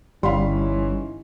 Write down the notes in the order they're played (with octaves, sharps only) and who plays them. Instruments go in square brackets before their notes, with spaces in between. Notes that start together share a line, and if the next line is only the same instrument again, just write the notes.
[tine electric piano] G1 [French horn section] E3 C#4 D#4 [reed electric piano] G3 [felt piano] F5 B5 C6